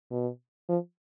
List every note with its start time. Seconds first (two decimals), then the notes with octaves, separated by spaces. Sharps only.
0.11 B2
0.69 F3